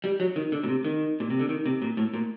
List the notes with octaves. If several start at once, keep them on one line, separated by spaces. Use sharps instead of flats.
G3
F#3
D#3
D3
A#2
C3
D#3
A#2
C3
D3
D#3
C3
A#2
A2
A#2